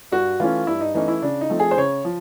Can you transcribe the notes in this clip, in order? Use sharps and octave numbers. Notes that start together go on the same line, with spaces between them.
G2 F#4
E3 A3 C#4 F4
G2 E4
D#4
E3 A3 C#4 D#4
E4
C#3 D4
D#4
F3 A3 C4
G#4
C5
C#3 C#5
F3